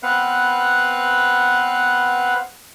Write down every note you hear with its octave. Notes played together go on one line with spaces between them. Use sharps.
B3 C4 B4 F5 F#5